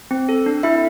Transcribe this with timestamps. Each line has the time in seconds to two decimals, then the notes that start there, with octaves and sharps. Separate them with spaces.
0.11 C4
0.29 A4
0.46 D4
0.63 D4 E4 E5